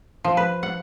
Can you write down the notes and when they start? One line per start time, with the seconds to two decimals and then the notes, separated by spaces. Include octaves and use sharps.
0.24 F3
0.37 B4
0.63 F#5